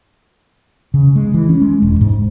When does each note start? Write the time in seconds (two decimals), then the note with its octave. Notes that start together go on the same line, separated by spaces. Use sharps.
0.94 C#3
1.16 G#3
1.34 E3
1.49 C#4
1.62 G#3
1.82 E1
2.01 G#2